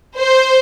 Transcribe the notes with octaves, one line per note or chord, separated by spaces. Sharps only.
C5